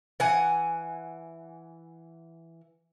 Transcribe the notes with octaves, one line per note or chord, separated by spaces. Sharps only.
E3 F#5 G#5